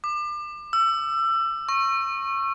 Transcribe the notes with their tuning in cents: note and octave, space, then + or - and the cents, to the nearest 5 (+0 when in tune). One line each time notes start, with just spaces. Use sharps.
D6 +30
E6 +30
C#6 -20